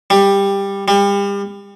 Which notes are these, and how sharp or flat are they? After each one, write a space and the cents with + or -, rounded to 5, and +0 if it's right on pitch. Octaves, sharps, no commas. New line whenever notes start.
G3 +15
G3 +35